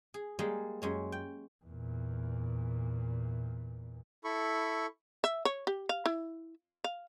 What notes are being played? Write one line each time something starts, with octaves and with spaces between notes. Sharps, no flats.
G#4
G3 G#3 A#3 G#4
F#2 G#3 C#5
G5
E2 A#2
E4 A4 B5 C#6
E5
C#5
G4
F5
E4
F5